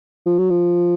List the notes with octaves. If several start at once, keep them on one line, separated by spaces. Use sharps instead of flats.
F3
F#3
F3